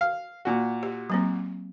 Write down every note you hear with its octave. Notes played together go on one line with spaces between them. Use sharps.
F5
A#2 F#4
G4
F#3 A#3 C4